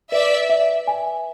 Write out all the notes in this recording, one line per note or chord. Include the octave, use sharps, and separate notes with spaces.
B4 D5 E5
E5
G#5